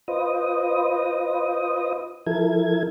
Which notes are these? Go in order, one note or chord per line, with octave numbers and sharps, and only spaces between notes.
F4 B4 C5 D#5 D#6
F3 E4 A4 A#4 G#6